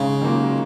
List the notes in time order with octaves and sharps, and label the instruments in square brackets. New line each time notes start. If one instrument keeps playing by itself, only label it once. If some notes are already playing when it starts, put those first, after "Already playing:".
Already playing: [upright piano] G#2 [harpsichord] C#3
[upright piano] D#3 F#3 A#3 F4